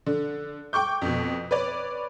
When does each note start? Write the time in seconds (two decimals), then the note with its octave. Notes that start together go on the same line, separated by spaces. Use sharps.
0.06 D3
0.73 G5 C#6 D6 G6
1.02 F2 B2
1.51 B4 C#5 D5